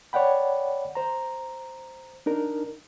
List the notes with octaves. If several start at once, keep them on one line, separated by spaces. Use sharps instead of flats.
C#5 D5 F#5 G5 B5
C5 A#5
D4 D#4 A#4